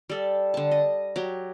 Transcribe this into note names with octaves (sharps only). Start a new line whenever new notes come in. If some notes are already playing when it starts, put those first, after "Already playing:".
G3 A4
D3 A5
D#5
F#3 G4